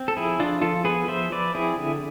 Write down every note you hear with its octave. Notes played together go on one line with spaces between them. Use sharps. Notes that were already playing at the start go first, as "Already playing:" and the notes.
Already playing: C4
A4
F3 E4 G#4
F3 D4 F4
F3 F4 A4
B3 G#4 B4
F3 C5 E5
F3 B4 D5
C4 E4 G#4
D3